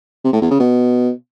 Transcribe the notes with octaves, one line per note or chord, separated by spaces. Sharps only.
C3
A2
E2
C#3
B2